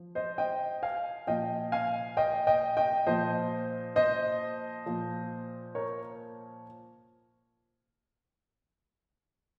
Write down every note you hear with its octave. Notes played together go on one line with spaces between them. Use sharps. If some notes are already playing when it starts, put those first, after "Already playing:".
Already playing: F3
C5 D#5
D#5 G5
F5 G#5
A#2 F3 D#5 G5
F5 G#5
D#5 G5
D#5 G5
D#5 G5
A#2 F3 C5 D#5
C5 D#5
A#2 F3
A#4 C#5